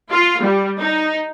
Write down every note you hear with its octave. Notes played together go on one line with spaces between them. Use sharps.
F4
G3
D#4